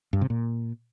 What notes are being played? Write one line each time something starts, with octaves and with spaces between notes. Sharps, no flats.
G2
C3
A#2